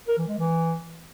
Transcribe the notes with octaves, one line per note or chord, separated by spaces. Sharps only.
A#4
E3
G#3
E3